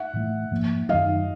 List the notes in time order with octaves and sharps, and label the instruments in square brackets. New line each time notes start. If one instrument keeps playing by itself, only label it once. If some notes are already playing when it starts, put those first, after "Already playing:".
Already playing: [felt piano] E5 F#5
[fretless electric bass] A2 E3 A3
G#2 F3 A#3
[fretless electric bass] F#2 D#3 F#3 [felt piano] D#5 F5